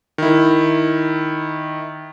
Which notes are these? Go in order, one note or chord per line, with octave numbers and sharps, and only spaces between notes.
D#3 E4